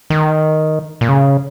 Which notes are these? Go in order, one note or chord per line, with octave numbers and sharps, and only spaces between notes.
D#3
A#2
C#3